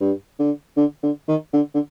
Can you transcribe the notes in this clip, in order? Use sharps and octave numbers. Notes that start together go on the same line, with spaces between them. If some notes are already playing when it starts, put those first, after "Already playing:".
G2
D3
D3
D3
D#3
D3
D3